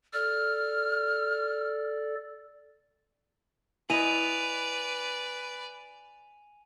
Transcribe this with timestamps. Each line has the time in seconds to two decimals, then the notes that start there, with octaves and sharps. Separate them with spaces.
0.13 A4 D5 F6
3.90 E4 B4 D5 D#5 G#5 D#7 F7